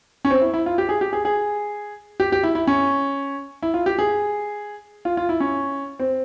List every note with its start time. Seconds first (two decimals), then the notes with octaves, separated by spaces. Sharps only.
0.25 C#4
0.31 C4
0.41 E4
0.54 E4
0.66 F4
0.78 G4
0.89 G#4
1.01 G4
1.13 G#4
1.25 G#4
2.20 G4
2.32 G4
2.43 E4
2.55 E4
2.67 C#4
3.63 E4
3.74 F4
3.86 G4
3.99 G#4
5.05 F4
5.17 F4
5.29 E4
5.40 C#4
6.00 C4